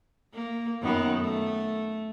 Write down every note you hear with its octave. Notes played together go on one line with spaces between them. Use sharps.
A#3
F#2 D#3 B3
A3